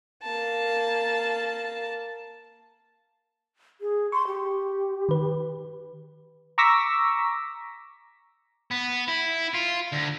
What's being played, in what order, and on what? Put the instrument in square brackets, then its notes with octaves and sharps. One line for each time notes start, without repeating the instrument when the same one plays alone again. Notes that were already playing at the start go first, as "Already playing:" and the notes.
[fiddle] A#3 A5
[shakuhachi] G#4
[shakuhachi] C6 [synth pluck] C#6
[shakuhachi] G4
[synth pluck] D#3 B4
[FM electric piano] A#5 C#6 D6 E6 A#6 B6
[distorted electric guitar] B3
E4
F4
D2